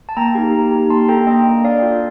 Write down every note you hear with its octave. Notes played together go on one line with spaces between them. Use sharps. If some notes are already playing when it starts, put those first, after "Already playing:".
A5
A#3 G5 A#5
D#4 G4
A#3
D#4 G4
A#3 A5 C6
D4 A4 G5 A#5
A#3 D#5 G5
D4 A4
D4 D5 F5
F4 A4